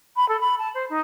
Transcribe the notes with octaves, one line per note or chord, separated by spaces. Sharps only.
B5
A4
B5
A5
C5
D#4